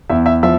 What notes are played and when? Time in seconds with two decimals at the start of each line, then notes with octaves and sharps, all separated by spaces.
0.10 E2 E5
0.26 E5
0.43 F3 E5